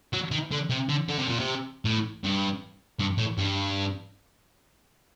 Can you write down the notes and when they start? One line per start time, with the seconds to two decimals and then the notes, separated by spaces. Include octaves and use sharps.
0.13 F#3
0.32 D#3
0.52 D3
0.71 C3
0.89 D3
1.09 D3
1.19 C3
1.29 A#2
1.40 C3
1.85 A2
2.24 G2
2.99 G2
3.18 A2
3.38 G2